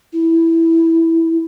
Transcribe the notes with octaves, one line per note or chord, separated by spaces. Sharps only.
E4